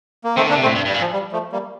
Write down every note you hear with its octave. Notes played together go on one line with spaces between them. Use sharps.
A#3
D#3 A3 C4
D3 A#3 D4
C3
A3 C4
A2
G2
G2 G3
A#2
F3
G3
F3 A3
G3 A#3